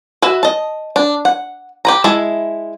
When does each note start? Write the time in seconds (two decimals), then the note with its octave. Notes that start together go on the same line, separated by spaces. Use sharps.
0.22 F#4 B4 E5
0.43 D#5 A5
0.96 D4
1.25 F#5
1.85 G4 B4 A#5
2.04 G#3 E4 E5 A5